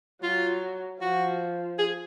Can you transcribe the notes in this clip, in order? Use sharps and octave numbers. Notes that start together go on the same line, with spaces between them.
F#3 F4
F3 F#4
G#4